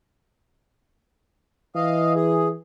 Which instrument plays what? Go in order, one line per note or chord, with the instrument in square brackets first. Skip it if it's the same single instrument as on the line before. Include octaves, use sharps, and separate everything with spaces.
[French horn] E3 [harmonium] D#5 F5
[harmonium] G#4